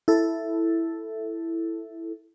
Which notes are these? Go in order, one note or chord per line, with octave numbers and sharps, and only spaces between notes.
E4 A4